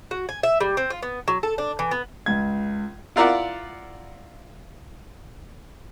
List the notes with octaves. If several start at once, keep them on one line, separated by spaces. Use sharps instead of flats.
F#4
G#5
E5
G3
C4
F4
B3
F#3
A4
D4
E3
B3
C#2 G#6
E4 F4 A#4 D5 E5 F#5